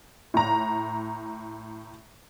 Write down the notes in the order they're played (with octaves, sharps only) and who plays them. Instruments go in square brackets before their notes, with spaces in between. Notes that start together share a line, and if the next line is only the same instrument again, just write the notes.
[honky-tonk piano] A2 A#5